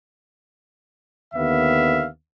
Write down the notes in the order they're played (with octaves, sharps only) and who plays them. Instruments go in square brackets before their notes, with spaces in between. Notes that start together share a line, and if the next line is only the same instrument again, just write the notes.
[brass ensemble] D#2 D3 B3 E5 F5